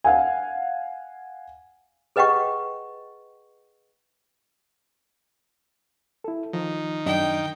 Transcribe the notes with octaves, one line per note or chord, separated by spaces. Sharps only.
F5 F#5 G#5
G#4 B4 D#5 F#5 G5 C#6
E4 A4
D#3 F3
F#2 D4 D#5 G5